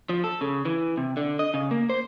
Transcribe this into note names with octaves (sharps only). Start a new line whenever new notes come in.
F3
A4
C#3
E3
C3
D3
D#5
C#3
A#3
C5